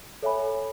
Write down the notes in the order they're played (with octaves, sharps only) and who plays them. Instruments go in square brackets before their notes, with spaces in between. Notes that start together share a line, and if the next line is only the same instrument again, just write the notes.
[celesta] A4 C#5 E5 G#5 B5